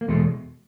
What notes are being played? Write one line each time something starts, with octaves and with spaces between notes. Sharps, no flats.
A#3
E2 B2 G#3 A3